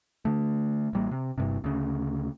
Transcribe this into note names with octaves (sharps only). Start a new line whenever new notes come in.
D3 A3
A1 G3 A#3
C3
G1 G2 C3
D2 C#3